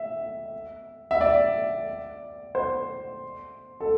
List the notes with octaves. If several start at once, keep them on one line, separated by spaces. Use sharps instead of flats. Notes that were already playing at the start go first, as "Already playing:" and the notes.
Already playing: E5
E5
D5
C5
A4